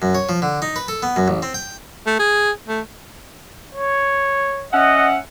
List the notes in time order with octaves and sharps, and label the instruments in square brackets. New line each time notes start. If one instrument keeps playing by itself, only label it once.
[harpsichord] F#2
C#5
F3
D3
D#4
B4
A4
B3
F#2
A1
C4
G5
[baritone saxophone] A3
G#4
A3
[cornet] C#5
[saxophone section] C#4 E5 F#5 [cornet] D#5